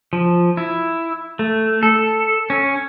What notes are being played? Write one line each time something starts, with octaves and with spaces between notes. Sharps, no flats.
F3
E4
A3
A4
C#4